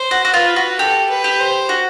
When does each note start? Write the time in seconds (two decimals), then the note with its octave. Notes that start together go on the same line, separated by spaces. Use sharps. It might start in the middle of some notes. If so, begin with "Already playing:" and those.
Already playing: C5
0.11 F#4
0.25 F#4
0.34 F4 B4
0.56 F#4
0.79 G4 A4
1.10 B4
1.24 G4
1.39 C5
1.69 F#4